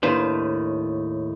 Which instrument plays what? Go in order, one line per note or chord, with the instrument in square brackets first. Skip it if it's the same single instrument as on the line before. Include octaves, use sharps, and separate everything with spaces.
[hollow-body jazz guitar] D#2 A2 D#3 D4 B4 C5